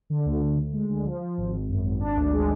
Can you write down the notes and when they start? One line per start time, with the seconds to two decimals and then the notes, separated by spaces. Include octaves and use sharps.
0.10 D3
0.25 D2
0.41 D2
0.57 D2
0.73 G#3
0.89 D3
1.05 F3
1.21 F3
1.37 G#1
1.53 G#1
1.69 F#2
1.84 G#1
2.00 D4
2.16 D2
2.32 G#3